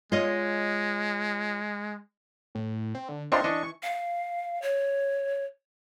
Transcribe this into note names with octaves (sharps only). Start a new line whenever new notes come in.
G#3 F4 C#5 D#5
A2
C4
D3
C4 D4 F4 C5 D#5 C6 C#6
E3 D4 D#5
F5
C#5